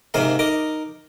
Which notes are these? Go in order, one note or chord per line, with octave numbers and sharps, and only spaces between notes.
G#2 C3 G#3 A#3 F5
D#4 A#4 D6